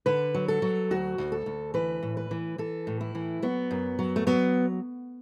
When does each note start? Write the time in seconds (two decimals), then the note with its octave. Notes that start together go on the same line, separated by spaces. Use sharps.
0.06 D3 B4
0.34 F#3
0.48 A4
0.62 F#3
0.91 D2 F#4
1.18 D2
1.32 A4
1.46 D2
1.74 E3 B4
2.03 A2
2.17 B4
2.31 E3
2.58 E3 A4
2.87 A2
3.01 E4
3.15 E3
3.42 F#3 B3
3.71 F#2
3.99 F#3
4.16 A3
4.27 F#3 B3